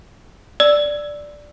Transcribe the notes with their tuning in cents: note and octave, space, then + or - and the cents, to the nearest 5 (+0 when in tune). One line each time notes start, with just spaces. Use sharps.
D5 +0 E6 +0